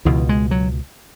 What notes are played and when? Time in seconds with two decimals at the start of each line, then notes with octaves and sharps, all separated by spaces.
0.05 C#2 B2 E3
0.29 G#3
0.51 F#3